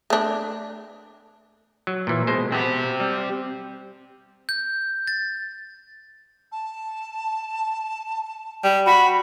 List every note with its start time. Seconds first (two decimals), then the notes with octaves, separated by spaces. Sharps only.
0.10 A3 D4
1.87 F#3
2.07 A#2 E3
2.27 B2 G#3 C5
2.52 B2 B3 C4 G4
3.00 G3
4.49 G6
5.07 A6
6.51 A5
8.64 G3
8.86 F#4 B5